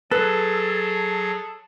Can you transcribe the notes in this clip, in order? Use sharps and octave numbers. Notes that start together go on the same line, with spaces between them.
F#3 G#4 A4 B4